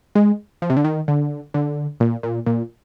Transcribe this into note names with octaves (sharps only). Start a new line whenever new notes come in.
G#3
F3
C3
D3
D#3
D3
D3
A#2
A#2
A#2